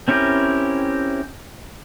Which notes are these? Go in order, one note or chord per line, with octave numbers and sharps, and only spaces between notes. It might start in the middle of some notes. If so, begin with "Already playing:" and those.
C4 C#4 E4 G4 A#4